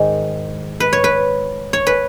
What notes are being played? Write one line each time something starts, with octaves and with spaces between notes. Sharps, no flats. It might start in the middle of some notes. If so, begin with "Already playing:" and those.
Already playing: G#2 D#3
B4
C#5
B4
C#5
B4